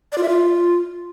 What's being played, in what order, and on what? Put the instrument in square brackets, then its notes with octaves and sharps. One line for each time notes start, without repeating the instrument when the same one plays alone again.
[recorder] D5
F4
E5
F4